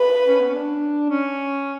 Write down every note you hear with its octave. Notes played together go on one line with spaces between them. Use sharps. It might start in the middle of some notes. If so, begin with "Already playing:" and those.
Already playing: B4
C#4
B3
C#4
D4
C#4